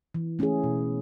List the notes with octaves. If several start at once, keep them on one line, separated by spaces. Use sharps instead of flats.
E3
A3 C#4 E4 G#4
B2